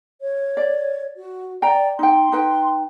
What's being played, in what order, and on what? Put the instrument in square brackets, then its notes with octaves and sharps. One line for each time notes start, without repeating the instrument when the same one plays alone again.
[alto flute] C#5
[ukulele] D5
[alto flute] F#4
[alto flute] D5 [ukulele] G5 A#5
[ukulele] D#4 G5 [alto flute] C6
[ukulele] D#4 B4 G5